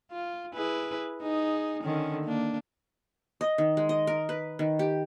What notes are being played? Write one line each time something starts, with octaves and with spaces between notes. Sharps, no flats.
F4
E4 G#4 B4
D#4 G#4
D3 D#3 C#4
A#3 D4
D#5
D#3
G#3
D#5
A#4
B4
D#3
G4